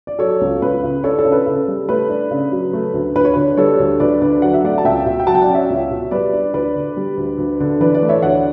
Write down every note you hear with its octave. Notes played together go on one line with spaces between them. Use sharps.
D5
F#3 A4 C#5
C#2
C#2 B4
C#3
D4 A4 C#5
A4
C#3
B4
C#3 A4
G3
A3 B4
D4
C#3
F#3
A3
D2
D2 B4
C#5
D3 B4
G3 A4 C#5
D2
D2 B4 D5
D3 B4 D5
F#3 F#5
E5
A3 D5 F#5
A5
C#2 E5 G5
B2
G5
F#3 F#5 A5
G5
D5 F#5
C#4
C#5 E5
C#2
B2
G3 B4 D5
D4
D2 B4 D5
D3
G3
D2
D2
D3
E3 B4 D5
B4 D5
A3
C#5 E5
D2 D5 F#5